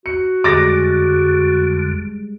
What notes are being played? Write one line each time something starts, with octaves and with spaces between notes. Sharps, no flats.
F#4 C#7
F2 D3 G3 G#3 D6 A6 A#6